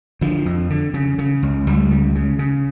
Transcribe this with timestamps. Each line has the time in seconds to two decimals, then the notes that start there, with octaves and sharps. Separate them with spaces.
0.21 D3 F3
0.46 F2
0.70 D3
0.94 C#3
1.19 C#3
1.43 C#2
1.67 C#2 G3
1.91 C#3
2.15 C#3
2.39 C#3